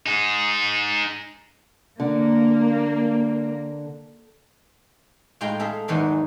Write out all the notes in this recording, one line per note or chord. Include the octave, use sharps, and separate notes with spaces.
D#4 G#4
D3 A#3
A2 G#3 F4 G5 A#5
G#4 A4 E5 F5
E2 G#2 D#3 E3 F#3